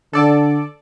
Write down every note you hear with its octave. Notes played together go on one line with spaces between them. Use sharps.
D3 A4 D5 A5